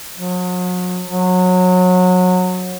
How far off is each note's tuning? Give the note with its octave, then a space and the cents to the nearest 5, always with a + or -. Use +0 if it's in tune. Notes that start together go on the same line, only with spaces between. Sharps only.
F#3 -40
F#3 -25